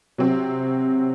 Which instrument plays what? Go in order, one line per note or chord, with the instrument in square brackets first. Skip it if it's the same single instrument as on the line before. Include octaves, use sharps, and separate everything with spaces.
[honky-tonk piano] C3 F#3 C4